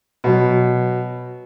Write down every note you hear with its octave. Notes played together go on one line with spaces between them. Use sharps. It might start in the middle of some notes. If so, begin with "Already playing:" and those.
B2 F#3